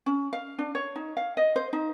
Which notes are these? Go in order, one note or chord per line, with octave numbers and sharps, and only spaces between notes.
C#4
F5
D4
C#5
D#4
F5
D#5
C5
D#4